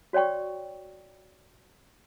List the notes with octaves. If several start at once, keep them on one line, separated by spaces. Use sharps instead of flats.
F#4 C#5 D5 G5 C#6